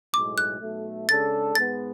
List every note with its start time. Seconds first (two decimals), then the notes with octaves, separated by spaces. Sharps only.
0.14 B1 A2 G#3 D6
0.38 F#6
0.61 B1 B2 A3
1.09 C#3 G#3 D4 A4 A6
1.55 G#2 G#3 B3 A6